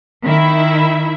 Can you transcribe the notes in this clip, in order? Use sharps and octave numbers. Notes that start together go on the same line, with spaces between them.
D#3 E4 E5